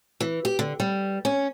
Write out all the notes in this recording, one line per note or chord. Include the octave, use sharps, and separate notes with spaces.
E3
G4
D3
G3
C#4